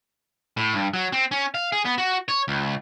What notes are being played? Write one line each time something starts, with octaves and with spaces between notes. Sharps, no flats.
A2
G2
F#3
C4
C#4
F5
G#4
B3
F#4
C#5
C#2